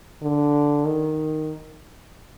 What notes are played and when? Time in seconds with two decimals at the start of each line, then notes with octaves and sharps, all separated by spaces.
0.23 D3
0.87 D#3